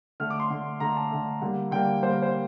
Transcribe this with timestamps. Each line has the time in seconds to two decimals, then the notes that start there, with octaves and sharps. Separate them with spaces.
0.20 D3 A3 F6
0.30 D6
0.40 C6
0.50 D3 A3
0.80 D3 A3 A#5
0.96 A5
1.11 D3 A3
1.41 D3 G3 A#3
1.71 D3 G3 A#3 G5
2.03 D3 G3 A#3 C5
2.12 A#4
2.22 C5